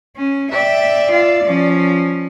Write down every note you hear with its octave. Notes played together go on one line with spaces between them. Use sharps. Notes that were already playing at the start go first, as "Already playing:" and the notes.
C#4
D5 E5 G5
F4 E5
F3 C#4